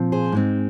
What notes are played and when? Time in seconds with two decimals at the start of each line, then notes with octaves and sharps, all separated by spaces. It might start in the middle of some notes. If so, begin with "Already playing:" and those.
Already playing: A#2 F3 C4
0.12 G#4 C5
0.32 G#2 G#3 C4